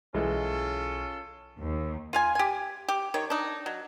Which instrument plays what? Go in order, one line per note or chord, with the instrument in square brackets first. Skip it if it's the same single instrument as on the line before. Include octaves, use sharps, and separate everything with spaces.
[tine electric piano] B1 [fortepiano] E3 G#3 [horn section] C#4 F4 A4
[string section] D#2
[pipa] F4 F5 G#5
G4 G#5
G4
D#3 C#5
D4 D#4
F#3